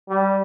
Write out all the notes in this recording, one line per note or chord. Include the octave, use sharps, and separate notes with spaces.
G3